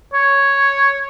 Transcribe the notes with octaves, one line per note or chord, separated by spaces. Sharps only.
C#5